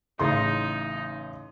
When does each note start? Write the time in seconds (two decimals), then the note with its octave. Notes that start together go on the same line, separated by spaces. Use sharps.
0.19 A1 C#3 D#4 C6